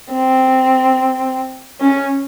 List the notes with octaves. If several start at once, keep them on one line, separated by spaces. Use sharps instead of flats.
C4
C#4